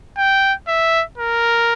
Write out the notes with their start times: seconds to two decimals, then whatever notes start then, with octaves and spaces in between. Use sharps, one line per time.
0.18 G5
0.68 E5
1.18 A#4